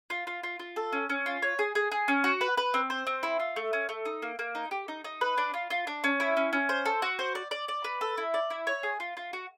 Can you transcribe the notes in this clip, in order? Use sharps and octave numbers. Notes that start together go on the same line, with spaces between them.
F4
F4
F4
F4
A4
C#4
C#4
F4
C#5
G#4
G#4
G#4
C#4
F#4
B4
B4
C4
C5
C4
E4
F4
A3
C#4
A3
D#4
A#3
A#3
D#4
G4
D#4
D#4
B4
D4
F4
F4
D4
C#4
E4
C#4
C#4
C5
A4
F#4
C5
D5
D5
D5
B4
A4
E4
D5
E4
C#5
G#4
F4
F4
F#4